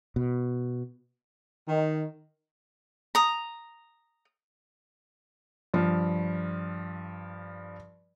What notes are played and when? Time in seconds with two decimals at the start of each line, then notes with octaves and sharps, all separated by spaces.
0.16 B2
1.68 D#3
3.15 A#5 D#6
5.74 G2 F3